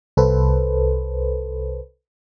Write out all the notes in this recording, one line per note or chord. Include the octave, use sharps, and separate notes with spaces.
C2 A4 B4 C5